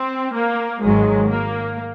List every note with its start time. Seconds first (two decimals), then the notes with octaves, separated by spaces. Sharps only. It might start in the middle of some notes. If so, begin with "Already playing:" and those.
Already playing: C4
0.34 A#3
0.82 G#1 G#2 D#3 F#3 G#3
1.29 A#3